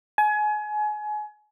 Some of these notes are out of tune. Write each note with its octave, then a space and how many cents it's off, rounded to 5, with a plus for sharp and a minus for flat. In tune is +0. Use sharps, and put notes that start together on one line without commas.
G#5 +30